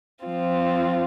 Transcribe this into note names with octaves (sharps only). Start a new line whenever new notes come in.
F3 C4 F4